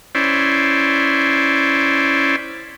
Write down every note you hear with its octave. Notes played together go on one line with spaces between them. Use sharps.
C#4 E4 C5 D5